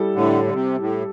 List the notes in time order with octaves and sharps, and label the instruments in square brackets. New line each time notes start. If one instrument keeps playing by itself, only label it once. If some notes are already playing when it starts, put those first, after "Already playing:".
Already playing: [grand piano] G3 E4 A4
[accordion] A2 D3
D3
C3
A2